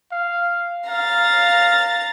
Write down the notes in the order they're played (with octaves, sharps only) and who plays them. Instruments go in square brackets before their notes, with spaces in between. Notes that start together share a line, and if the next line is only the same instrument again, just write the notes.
[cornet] F5
[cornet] F5 [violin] A#5 A6